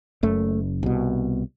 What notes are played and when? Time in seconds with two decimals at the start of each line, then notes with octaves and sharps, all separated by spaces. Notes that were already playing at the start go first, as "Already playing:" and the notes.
0.23 F#1 F#2 A3
0.83 C2 B2